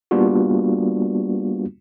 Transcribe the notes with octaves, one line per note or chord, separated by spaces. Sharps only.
G3 A#3 B3 D4 F4 F#4